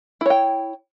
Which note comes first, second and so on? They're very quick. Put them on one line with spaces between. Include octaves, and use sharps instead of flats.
E4 C#5 G5